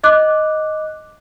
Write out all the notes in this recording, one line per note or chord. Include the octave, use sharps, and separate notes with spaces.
D#5 D6 F#6